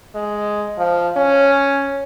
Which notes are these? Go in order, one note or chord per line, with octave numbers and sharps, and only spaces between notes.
G#3
F3
C#4